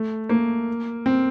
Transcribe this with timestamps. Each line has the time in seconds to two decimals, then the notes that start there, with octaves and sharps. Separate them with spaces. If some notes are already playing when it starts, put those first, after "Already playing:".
Already playing: A3
0.29 A#3
1.06 C4